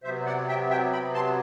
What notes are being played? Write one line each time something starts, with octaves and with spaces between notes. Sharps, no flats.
C3 F#3 B3 C5 E5
D5 F#5
E5 G5
E5 G5
G5 B5
A5 C6